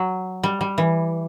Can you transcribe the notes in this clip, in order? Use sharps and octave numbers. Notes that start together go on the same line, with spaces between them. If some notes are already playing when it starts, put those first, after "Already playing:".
Already playing: F#3
G3
G3
E3